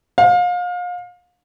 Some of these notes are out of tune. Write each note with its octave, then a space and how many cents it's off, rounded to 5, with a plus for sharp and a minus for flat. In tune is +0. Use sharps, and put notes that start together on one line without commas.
F5 +35